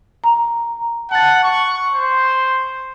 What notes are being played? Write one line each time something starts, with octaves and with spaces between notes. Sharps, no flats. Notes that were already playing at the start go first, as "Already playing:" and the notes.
A#5
F#5 A5 A6
C#6
C5